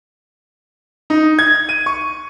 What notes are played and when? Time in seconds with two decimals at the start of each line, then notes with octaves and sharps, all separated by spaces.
1.10 D#4
1.39 G#6
1.69 D#7
1.86 C#6